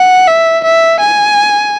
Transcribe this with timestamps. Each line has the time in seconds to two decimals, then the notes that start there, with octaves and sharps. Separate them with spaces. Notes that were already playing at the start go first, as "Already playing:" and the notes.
Already playing: F#5
0.27 E5
0.64 E5
1.00 G#5